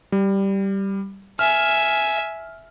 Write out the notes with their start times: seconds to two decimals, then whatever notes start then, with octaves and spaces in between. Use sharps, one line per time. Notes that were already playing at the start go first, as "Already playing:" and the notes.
0.12 G3
1.39 E5 G#5 F6